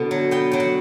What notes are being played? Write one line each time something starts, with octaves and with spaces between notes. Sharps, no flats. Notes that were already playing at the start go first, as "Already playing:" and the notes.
Already playing: B2 D3 B3
F#3
B3 G5
F#3 G5
F#5